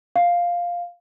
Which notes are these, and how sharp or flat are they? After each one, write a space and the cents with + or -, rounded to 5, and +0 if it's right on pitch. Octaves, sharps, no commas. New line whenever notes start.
F5 +5